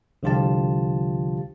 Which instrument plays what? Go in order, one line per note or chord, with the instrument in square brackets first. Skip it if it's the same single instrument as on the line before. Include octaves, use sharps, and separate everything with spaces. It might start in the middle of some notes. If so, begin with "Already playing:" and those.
[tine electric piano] C2 D3 F3 F4 G4 A5